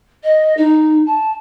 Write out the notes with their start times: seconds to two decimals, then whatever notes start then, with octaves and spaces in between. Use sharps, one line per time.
0.23 D#5
0.57 D#4
1.06 A5